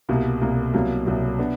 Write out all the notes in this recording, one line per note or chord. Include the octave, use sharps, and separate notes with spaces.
C2 B2 G3 A#3
C2 B2 G3 A#3
C2 B2 F#3 A#3
C2 B2 F#3 A#3
B3 D4